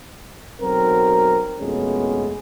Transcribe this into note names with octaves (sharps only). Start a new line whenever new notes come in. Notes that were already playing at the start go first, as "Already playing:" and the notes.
B1 F#3 C4 F#4 A#4
F2 B2 G#3 A3 B3 C#4